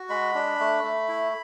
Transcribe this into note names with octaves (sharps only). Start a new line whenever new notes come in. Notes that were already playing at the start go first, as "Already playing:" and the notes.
Already playing: F#4
G#3 B5
D4
A3
A3
E4